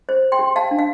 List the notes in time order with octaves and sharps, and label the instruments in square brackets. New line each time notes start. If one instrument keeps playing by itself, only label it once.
[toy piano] C5
G5 C6
G4
F5 A5
D4
F5